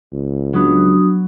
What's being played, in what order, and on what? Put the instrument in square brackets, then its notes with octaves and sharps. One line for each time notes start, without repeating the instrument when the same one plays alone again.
[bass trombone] C#2
[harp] F#3 B3 [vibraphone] D4 F#4 D#6